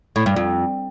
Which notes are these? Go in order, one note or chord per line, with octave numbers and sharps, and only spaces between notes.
A2
G2
F2